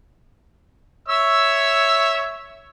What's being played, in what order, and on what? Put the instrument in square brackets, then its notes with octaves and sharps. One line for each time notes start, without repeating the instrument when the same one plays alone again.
[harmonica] C#5 E5 E6